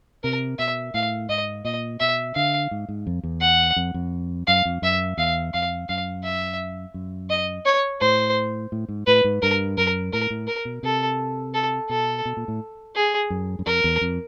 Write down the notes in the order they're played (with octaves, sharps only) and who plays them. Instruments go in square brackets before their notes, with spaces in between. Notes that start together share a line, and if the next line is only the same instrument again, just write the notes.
[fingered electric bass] C3 [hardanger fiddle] A#4
[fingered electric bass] B2 [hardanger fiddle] E5
[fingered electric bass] A2 [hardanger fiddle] F5
[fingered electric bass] G#2 [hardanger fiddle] D#5
[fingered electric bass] A#2 [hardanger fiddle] D#5
[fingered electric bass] B2 [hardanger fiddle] E5
[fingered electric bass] D3 [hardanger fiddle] F5
[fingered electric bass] G#2
G#2
F2
E2
[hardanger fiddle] F#5
[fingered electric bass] F2
F2
[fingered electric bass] F#2 [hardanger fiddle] F5
[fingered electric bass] F2
[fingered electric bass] F#2 [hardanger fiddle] E5
[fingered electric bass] E2 [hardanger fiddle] F5
[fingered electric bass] F2 [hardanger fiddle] F5
[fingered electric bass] F#2 [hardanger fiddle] F5
[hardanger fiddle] E5
[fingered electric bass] F#2
[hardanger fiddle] D#5
C#5
[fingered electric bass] A2 [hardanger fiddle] C5
[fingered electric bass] A2
G#2
[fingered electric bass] A2 [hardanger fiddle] B4
[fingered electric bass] G#2
[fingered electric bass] G2 [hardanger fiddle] A#4
[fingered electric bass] F#2 [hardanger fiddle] A#4
[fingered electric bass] A2 [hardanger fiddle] A#4
[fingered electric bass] A2
[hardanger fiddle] A#4
[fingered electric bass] B2
[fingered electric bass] C3 [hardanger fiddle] A4
[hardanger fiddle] A4
[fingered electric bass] B2 [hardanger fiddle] A4
[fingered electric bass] B2
A#2
A2
[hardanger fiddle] G#4
[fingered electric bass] F#2
F#2
[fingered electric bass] F2 [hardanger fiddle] A#4
[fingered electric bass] E2
F2